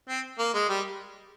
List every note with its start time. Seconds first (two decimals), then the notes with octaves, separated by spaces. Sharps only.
0.09 C4
0.39 A#3
0.54 G#3
0.69 G3